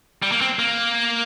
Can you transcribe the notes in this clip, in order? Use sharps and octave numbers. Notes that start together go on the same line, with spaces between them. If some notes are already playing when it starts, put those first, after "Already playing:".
G3
A#3
C4
A#3